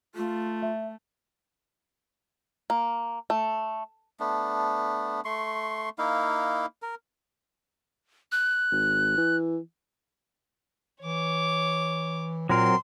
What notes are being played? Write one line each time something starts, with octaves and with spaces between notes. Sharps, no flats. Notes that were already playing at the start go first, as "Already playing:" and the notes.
A3 F4
E5
A#3
A3
A3 B3 D4
A3 C6 C#6
A#3 D#4 E4 F5
A#4
F#6
G#1
E3
E3 C#5 D6
A#2 F#3 C4 A#4 C6